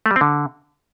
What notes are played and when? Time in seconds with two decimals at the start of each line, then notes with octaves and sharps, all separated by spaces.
0.06 A3
0.11 G3
0.16 C4
0.21 D3